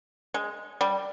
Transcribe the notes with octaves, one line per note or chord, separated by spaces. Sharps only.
G#3
G3